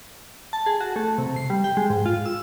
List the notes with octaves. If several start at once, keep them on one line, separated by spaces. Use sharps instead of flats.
A5
G#4
F#4
A3
C3
C7
G3
G5
G#3
G#2
F4
E6